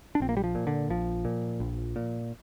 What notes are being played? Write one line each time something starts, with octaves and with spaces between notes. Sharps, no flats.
D4
A#1 C4
A#3
G3
F3
A#2
D3
A#1 F3
A#2
A#1
A#2